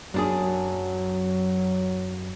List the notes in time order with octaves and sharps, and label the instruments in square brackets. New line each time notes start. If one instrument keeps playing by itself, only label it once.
[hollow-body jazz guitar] F#2 D4 G#4 [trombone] F#3